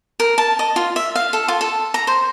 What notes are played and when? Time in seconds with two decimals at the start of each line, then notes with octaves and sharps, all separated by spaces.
0.20 A#4
0.38 A5
0.59 D#5
0.76 F4
0.96 E5
1.16 F5
1.33 A4
1.48 F4
1.61 A4
1.94 A#5
2.07 C5